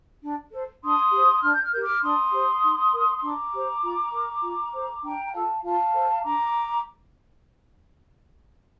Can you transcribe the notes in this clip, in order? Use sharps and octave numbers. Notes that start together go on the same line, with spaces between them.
D4
A4 C5
D4 C6 D#6
G4
C5
D4 F6
G6
F6
G4 A#4 G6
D6 F6
D4 C6 D#6
G4 C5
D#4
A#4
D#6
D4 A#5 D6
G4 C5
F4
A#4
F4
A4 C5
D4 G5 A#5
A#5
F4 A4 F5 A5
F4 F5 A5
A4 C5
D4 A#5 D6